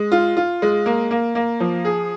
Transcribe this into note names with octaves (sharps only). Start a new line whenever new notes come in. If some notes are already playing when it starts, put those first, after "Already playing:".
Already playing: G#3
F4
F4
G#3
A#3
A#3
A#3
F3
G#4